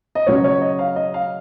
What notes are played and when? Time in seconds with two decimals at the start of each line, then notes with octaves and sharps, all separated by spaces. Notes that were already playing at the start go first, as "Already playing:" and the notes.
0.15 D#5
0.27 C#3 F#3 C#4 C#5
0.44 C#5
0.61 D#5
0.79 F5
0.96 D#5
1.14 F5